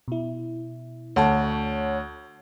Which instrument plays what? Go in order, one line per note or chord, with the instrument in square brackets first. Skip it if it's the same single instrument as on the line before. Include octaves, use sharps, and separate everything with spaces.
[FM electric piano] B2 E4
[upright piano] D2 [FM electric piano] C#5 F#5 A5